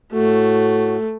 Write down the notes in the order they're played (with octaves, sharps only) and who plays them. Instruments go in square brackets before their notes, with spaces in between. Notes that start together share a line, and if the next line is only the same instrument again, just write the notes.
[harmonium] A2 F#4 [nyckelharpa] A3